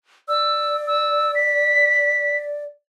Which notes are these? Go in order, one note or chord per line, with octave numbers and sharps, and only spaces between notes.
D5 E6
E6
B6